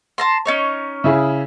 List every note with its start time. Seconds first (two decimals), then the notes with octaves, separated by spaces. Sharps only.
0.18 A5 A#5 C6
0.46 C#4 D#4 C#5
1.04 C#3 E4 G#4